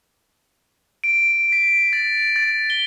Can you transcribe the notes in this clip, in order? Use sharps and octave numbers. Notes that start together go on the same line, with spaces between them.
D7
B6
A6
A6
G7